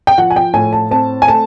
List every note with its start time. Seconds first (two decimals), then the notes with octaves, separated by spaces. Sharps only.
0.07 G5
0.18 F3 F#5
0.31 G#5
0.36 G5
0.54 A2 G#5
0.73 A5
0.91 C4 A5
1.22 G#5
1.28 A3 A5